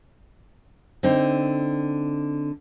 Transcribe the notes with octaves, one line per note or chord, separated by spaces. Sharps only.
D3 C4 D#4